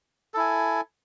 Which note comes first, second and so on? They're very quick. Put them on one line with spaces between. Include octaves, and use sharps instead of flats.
A4 E4 G#5